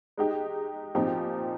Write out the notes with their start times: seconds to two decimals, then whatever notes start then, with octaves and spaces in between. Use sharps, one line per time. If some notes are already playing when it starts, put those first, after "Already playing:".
0.17 G#3 D#4 G4
0.95 A#2 F3 C4 D#4 G4